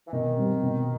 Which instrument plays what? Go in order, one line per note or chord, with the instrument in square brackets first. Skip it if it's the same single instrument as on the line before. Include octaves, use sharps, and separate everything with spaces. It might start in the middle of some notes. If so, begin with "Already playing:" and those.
[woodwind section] E3
[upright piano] B2 [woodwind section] D#3
[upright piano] G3 C4
B2